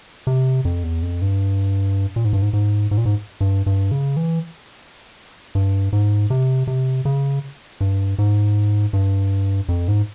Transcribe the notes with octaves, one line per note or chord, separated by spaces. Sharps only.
C3
F2
E2
F2
G2
A#2
G#2
G2
G#2
G#2
G#2
A#2
G#2
G2
G2
C#3
E3
G2
G#2
C3
C3
C#3
G2
G#2
G2
F2
G#2